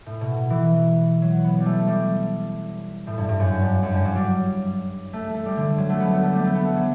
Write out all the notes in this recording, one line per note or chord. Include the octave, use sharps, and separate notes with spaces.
A2
B2
E3
F#3
B3
G3
A3
G3
A2
G2
G2
F#2
G2
F#2
G2
F#3
G3
A3
A3
G3
D3
F#3
A3
B3
A3
A3
G3
A3
B3
A3
F#3